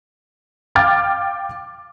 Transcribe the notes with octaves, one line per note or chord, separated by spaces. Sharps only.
F5 G5 D6 F6 A6